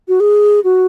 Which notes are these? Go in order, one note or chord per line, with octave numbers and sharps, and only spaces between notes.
F#4
G#4
F#4